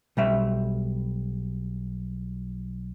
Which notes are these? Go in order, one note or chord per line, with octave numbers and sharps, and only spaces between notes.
B1 G3 E5